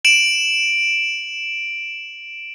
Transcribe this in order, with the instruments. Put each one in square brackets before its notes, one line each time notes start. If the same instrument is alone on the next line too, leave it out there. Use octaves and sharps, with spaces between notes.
[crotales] D7 E7 F#7